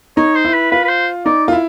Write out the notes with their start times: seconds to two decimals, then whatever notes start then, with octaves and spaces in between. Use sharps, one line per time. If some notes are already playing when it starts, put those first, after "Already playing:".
0.17 D#4 C#5
0.35 C5
0.45 E4
0.54 B4
0.72 F4 B4
0.85 B4
0.89 C5
1.26 D#4 D5
1.48 F4
1.53 E4